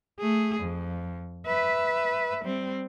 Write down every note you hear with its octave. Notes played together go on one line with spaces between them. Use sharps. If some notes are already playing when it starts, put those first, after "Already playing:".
A3 G#4
F2
B4 E5
G3 C4